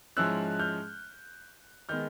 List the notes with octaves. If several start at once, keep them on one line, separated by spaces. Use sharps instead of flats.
G#2 F3 G#3 C#4 E4 E6 F#6
F6 G6
D#3 G#3 B3 F6 G6